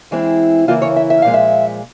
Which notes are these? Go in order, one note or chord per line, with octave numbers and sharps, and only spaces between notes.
E2 E3 G#3 C4 E4
C#3 E3 A#3 E4 F4
C#5
E5
E5
A#2 F3 G#3 F5
E5